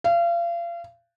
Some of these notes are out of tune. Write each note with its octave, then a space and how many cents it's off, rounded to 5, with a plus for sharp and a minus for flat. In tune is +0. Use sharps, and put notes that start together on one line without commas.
F5 -35